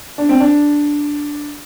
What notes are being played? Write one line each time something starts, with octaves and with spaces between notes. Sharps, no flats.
D4
C4
D4